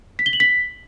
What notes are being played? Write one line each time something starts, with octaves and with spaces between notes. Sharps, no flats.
B6
G7
F#7
B6